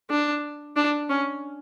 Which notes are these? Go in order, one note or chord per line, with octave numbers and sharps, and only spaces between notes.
D4
D4
C#4